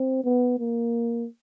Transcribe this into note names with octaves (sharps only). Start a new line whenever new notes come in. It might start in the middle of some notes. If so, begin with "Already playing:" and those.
Already playing: C4
B3
A#3